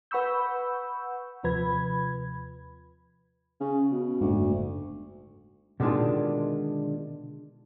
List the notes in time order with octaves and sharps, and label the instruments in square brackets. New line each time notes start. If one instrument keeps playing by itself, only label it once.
[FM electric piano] B4 F#5 B5 C#6 E6 G6
D#2 C3 F3 B4 B5 G#6
[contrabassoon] C#3
B2
[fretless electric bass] F#1 G#2 [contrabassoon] D2
[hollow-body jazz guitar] B2 D3 D#3 G#3 D4 F4